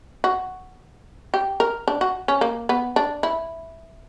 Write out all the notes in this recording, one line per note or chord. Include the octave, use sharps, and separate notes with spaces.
F#4
G4
A#4
D4
F#4
C#4
A#3
B3
D4
E4